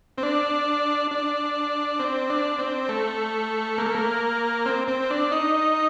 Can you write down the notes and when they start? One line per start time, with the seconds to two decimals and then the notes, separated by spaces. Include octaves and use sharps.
0.18 C4
0.23 D4
1.11 D4
1.99 C4
2.30 D4
2.59 C4
2.89 A3
3.78 A#3
3.86 A3
3.95 A#3
4.66 C4
4.88 C4
5.11 D4
5.32 D#4